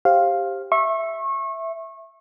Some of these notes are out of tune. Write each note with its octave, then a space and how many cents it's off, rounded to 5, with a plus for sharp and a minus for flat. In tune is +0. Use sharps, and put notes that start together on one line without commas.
G4 +0 C5 +25 F5 +0
E5 +0 C#6 -30